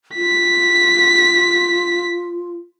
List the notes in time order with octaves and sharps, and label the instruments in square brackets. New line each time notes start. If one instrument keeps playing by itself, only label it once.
[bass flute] F4 [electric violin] B6